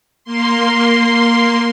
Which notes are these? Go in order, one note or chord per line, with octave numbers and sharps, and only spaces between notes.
A#3 C6